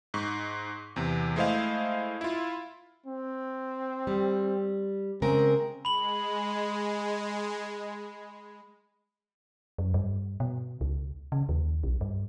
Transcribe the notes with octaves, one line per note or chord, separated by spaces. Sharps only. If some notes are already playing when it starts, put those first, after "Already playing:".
G#2 C#6
E2 C3
G#3 A3 E4 C5 D#5 F5
E4 F4
C4
G3
C#3 G#3 C4 A#4
G#3 B5 F#7
F#2
G2
B2
C#2
C#3
D#2
B1
G2